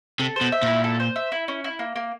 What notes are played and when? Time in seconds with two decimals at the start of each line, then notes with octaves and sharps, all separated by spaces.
0.20 C3 A4
0.36 B2 C5
0.52 E5
0.63 A#2
0.68 E4
0.84 A4
1.00 C5
1.16 E5
1.32 E4
1.48 C#4
1.64 E4
1.79 A#3
1.96 A#3